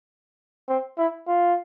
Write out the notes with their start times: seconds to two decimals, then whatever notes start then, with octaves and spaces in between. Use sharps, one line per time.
0.68 C4
0.98 E4
1.28 F4